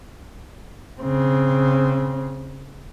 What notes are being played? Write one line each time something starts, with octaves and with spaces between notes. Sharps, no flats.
C#3 C4